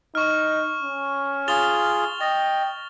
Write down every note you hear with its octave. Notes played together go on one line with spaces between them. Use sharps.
D#4 C#6 F6
C#4
F4 G#4 A6 F7 G7
D#5 G5 A6